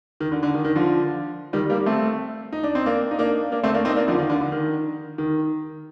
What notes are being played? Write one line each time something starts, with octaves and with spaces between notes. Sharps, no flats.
D#3
D3
D3
D#3
D#3
D3 F3
D#3 G3
G3 A#3
A3 C4
D#4
D4
C4
A#3 D4
D#4
A#3 D4
A#3 D4
A3 C4
A#3 D4
C4 D#4
A#3 D4
D3 F3
D#3
D3
D3
D#3
D#3